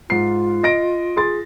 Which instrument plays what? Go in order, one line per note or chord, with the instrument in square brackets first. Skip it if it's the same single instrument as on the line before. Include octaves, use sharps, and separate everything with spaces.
[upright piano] G#2 C7 [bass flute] F4
[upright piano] D#5 A#6 D7
G#4 C6 A6